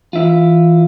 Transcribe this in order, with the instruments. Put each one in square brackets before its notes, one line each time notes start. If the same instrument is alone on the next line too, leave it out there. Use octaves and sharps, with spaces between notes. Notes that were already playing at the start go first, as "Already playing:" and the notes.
[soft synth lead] E3 [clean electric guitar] F4 E5